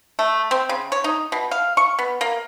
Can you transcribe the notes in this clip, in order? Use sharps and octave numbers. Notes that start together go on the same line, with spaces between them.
A3
C4
C#3
C#5
D#4
B2
F5
C#6
B3
A#3